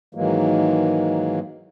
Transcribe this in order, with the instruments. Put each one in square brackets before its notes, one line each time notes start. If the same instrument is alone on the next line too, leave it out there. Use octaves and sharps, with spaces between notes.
[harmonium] G#2 D#3 E3 F#3 G#3 A#3